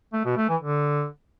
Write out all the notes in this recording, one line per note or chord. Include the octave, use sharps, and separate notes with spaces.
A3
B2
A3
E3
D3